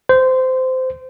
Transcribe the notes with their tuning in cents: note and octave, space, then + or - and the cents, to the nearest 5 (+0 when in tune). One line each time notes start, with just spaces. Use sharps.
C5 -20